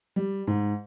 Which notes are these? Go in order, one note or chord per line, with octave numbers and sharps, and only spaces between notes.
G3
G#2